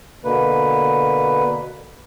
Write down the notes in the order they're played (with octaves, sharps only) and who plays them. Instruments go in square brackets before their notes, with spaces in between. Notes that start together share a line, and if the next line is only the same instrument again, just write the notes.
[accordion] B2 D3 A#3 B4